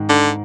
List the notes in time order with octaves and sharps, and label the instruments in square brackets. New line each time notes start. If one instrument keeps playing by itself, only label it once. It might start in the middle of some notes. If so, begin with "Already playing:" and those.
Already playing: [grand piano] G#2 D#3 G#3
[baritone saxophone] D3